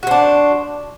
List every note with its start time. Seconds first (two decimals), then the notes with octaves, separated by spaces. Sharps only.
0.03 F#4
0.07 C5
0.11 D4